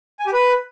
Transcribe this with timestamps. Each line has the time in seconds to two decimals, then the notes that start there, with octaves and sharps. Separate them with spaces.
0.20 G#5
0.26 G4
0.33 B4